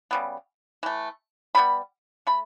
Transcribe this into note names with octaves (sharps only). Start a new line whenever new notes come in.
C#3 G3 B3
E3 A3
C#3 G3 B3 B5
A3 B5